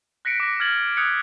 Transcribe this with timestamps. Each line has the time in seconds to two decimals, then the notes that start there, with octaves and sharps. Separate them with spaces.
0.25 F#6 A#6 B6 C#7 D7
0.40 D6 A#6
0.60 F6 G#6 A6 F#7
0.97 D#6 F#6 G#6 C#7